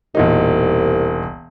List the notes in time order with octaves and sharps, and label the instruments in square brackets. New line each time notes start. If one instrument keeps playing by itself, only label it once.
[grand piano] E1 A#2 D#4 [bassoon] C2